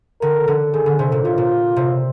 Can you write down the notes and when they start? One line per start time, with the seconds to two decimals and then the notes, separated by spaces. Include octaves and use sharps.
0.21 D3 A#4
0.48 D3
0.73 D#3 G#4
0.86 D3
0.99 C3
1.12 A#2
1.25 C3 F4
1.38 A#2
1.76 C3